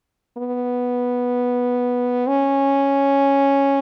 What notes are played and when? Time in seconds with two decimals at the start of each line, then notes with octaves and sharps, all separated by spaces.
0.38 B3
2.28 C#4